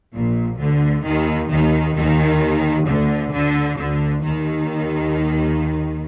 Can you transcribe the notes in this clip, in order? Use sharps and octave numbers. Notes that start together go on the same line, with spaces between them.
A#1 A#2
D2 D3
D#2 D#3
D#2 D#3
D#2 D#3
D2 D3
D2 D3
D2 D3
D#2 D#3